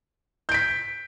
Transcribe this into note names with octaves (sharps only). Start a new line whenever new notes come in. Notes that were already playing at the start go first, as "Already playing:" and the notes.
G6 B6 D7